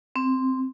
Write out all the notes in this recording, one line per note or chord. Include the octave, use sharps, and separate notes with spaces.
C4